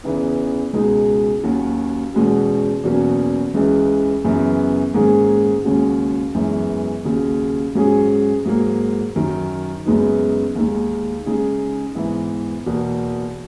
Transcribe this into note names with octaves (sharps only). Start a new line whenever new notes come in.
E2 C#3 E3 B3 D#4
C#2 B2 G#3 D#4 G#4
D#2 D#3 F#3 C#4 F#4
E2 B2 G#3 C#4 F#4
E2 B2 F#3 A#3 C#4
C#2 C#3 E3
F#2 C#3 E3 B3
G#2 D#3 A#3 C#4 G#4
D#2 C#3 G#3 C#4 F#4
F#2 E3 G#3 B3
D#2 C#3 F#3
G#2 F#3 C#4 G#4
G#2 F#3 A#3
F#2 D#3 F#3
F#2 C#3 G#3 B3 D#4
D#2 D#3 G#3
C#3 G#3 D#4 G#4
G#2 E3 G#3 B3 E4
E2 B2 A#3